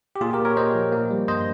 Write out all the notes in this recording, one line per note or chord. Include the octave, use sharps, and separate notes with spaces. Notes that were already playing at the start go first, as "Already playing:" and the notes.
G4
A#2 F4 G#4
G4 A#4
A#2
A#4 C#5
A#3 C5 D#5
F3
A#3
G3
G2 C5 D#5